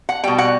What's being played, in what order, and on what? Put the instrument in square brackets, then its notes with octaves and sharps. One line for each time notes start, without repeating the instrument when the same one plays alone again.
[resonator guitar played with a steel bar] F#5
B2 G3 G5
F#5